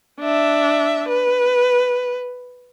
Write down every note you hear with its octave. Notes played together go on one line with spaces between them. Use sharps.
D4 E5
B4